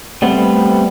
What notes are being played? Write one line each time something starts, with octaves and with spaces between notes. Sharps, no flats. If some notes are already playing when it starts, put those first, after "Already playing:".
G3 A3 B3 C4